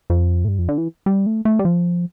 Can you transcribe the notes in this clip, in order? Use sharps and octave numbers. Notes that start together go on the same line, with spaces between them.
F2
A2
G2
F2
D3
E3
G3
A3
A3
G3
F3